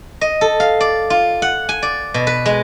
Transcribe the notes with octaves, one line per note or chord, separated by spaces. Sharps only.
D#5
A4
F5
D5
F4
F#5
G#5
D5
B2
B4
G#3